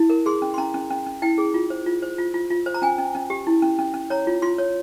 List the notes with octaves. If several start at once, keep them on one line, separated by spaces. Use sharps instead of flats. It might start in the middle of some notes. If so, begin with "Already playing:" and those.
Already playing: E4
A#4
G#4 C6
C#4
C6
C#4 A#5
C#4
C#4
C#4
E4 G5
G#4
F4
C5
F4
C5
F4
F4
F4
C5
A#5
C#4 G#5
C#4
C#4
G4
E4
C#4
C#4
C#4
C#5 A#5
F4
F4 C6
C#5